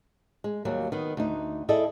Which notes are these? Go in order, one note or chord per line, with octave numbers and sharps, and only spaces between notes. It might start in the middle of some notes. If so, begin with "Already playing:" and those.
G#3
D#2 F#3 G3 A#3
D#3 B3
D2 D#4
E4 G#4 A4 D5 D#5